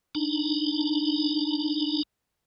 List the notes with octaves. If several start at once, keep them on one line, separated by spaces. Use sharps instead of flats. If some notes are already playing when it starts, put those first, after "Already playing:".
D4 D#4